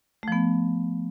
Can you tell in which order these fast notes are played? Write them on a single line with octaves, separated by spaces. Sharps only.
A3 F3 B3